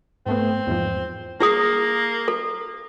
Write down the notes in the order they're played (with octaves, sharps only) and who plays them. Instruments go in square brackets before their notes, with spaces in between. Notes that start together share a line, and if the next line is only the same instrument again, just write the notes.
[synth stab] G#2 A3 B3 [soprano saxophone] C4
[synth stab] E2 G#2 F3
[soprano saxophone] A#3 [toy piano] E4 G#4 D#6 [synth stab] A#6
[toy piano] A4